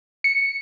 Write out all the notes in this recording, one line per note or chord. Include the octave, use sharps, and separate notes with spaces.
C#7